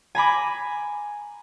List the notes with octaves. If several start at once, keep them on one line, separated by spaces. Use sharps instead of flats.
G#5 A#5 B5 D6